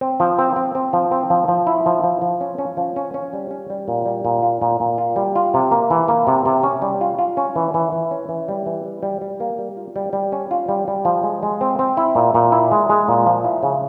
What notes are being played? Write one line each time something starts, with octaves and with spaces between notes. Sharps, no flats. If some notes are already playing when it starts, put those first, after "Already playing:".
C4
F3
C4
C4
C4
F3
C4
F3
F3
E4
F3
F3
F3
C#4
C#4
F3
C#4
C#4
G3
C#4
G3
A#2
G3
A#2
F4
A#2
A#2
F4
G3
F4
C3
A#3
E3
A#3
C3
C3
C#4
G3
F4
F4
C#4
E3
E3
E3
C#4
E3
G3
E3
G3
G3
G3
A#3
G3
F4
G3
G3
C#4
F4
G3
G3
F3
G#3
G#3
C4
C4
E4
A#2
A#2
E4
G#3
G#3
A#2
F3
E4
C#3